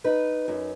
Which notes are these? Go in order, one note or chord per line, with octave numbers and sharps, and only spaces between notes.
D#4 B4
F#2